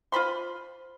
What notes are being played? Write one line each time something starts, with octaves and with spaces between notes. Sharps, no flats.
F4 C5 B5 C6